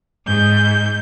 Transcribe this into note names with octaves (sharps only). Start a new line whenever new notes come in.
G#2 G6